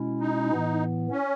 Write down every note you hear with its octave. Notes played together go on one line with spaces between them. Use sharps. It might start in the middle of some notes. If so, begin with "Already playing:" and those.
Already playing: B2 G#3 C#4 E4
D#4
A2 E3 B3
C#4